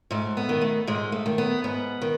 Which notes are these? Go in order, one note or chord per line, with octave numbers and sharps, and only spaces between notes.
G#2 A3
B3
D#3
A3
G#2 G#3
A3
D#3
B3
G#2 B3
D#3